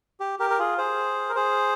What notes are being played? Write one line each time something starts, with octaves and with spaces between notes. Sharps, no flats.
G4
G4 A#4
A#4
F4 G#4
G#4 C5
A#4
G#4 C5